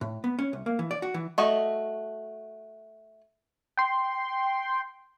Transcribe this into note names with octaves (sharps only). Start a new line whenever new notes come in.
A2
B3
C#4
C2
A#3
E3
D5
F#4
E3
A3 F#4 D#5
G5 C6